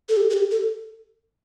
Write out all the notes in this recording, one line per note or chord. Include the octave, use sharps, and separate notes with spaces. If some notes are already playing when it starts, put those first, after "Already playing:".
A4
G4
A4
G4
A4